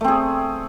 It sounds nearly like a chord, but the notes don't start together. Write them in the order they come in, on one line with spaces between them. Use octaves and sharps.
A3 C4 G#4